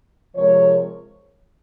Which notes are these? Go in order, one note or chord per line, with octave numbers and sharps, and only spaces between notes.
C3 F3 G#3 A#4 C#5